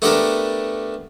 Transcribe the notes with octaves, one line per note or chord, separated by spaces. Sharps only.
A3 B3 D4 G4 A4 A#4